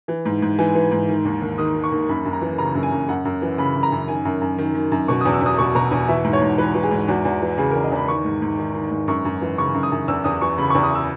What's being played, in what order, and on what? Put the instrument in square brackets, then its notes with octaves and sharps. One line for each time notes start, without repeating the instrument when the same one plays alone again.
[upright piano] E3
G#2
G#2
E3 G#5
E3
G#2
D#3
D#2
D#2
D#3 D#6
D#3
C#6
D#2
F#2 B5
F#2
A#5
E3
C#3 A#5
F#2
G#5
F#2
F#2 F#5
F#2
E3
C#3 B5
F#2
A#5
F#2
D#3 G#5
F#2
F#2
D#3
D#3
F#2
B2 C#6
D#6
E2
E6
E2 D#6
B2 C#6
B2 A#5
E2 G#5
E3 E5
G#2
C#5
G#2
E3 B4
E3
G#4
G#2
E2 F#4
E2
E3
C#3 G#4
A#4
E2
D#5
E2 B5
D#3 C#6
G#2
G#2
D#3
D#3
G#2
F#2 C#6
F#2
E3
C#3 C#6
F#2
D#6
F#2
E2 E6
E2 D#6
E3 C#6
C#3 B5
C#6
E2
D#6
E6